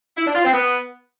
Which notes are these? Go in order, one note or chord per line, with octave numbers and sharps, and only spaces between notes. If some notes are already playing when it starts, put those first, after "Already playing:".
E4
D4
F4
C4
B3